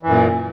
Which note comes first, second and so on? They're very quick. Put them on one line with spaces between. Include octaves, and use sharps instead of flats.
E3 F#2 A#2